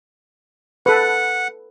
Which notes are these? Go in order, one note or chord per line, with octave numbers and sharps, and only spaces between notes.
A4 B4 F#5